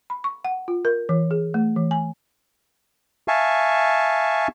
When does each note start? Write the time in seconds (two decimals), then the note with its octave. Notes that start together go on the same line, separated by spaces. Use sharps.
0.10 B5
0.24 C#6
0.45 F#5
0.68 F4
0.85 A#4
1.09 E3
1.31 G#4
1.54 A3
1.76 E3
1.91 G#5
3.28 E5 F5 G#5 A5 C#6